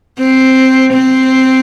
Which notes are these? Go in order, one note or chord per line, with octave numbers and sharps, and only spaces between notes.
C4
C4